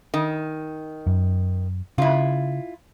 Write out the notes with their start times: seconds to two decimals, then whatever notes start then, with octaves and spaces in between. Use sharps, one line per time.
0.14 D#3
1.07 F#2
1.98 C#3 E4 F4